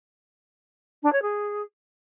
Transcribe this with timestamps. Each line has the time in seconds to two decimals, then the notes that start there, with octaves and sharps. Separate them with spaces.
1.03 D4
1.12 C#5
1.22 G#4